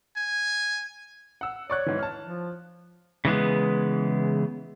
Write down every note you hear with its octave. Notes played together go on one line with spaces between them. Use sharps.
G#5
F#5 E6
C#5 D5 C#6 F#6
G#2 E3
A5 F6
F3
C#3 E3 G#3 B3